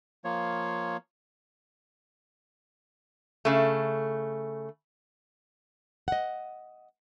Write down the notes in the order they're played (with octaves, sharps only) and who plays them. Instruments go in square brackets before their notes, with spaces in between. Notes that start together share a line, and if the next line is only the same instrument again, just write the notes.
[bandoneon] F3 A#3 C#5
[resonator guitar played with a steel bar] C#3 A3
[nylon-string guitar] D#5 F#5